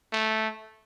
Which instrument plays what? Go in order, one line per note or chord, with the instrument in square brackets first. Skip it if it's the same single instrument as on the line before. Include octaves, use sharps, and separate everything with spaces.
[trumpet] A3